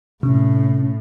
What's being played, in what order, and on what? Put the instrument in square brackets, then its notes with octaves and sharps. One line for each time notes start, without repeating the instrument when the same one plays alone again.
[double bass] A2 [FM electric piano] C3 [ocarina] C#4